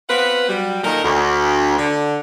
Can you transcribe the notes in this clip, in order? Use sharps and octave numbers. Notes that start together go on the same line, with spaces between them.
B3 C4 F4 B4 F#5
F#3 G3
A#2 D#3 A4 A#4
D2
D3